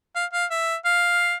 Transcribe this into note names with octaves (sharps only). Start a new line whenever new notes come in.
F5
F5
E5
F5